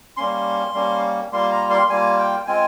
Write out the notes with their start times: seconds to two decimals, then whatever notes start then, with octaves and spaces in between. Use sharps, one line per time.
0.17 G3 A#3 C#4 C6
0.74 G3 A#3 C#4
1.32 G3 A#3 F4 C6
1.52 A#5
1.70 C6
1.89 G3 A#3 F4 G#5
2.19 G5
2.47 G#3 C4 F4 G#5